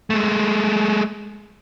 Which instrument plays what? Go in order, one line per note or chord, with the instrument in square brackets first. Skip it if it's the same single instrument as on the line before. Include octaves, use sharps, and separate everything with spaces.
[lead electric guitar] G#3 A3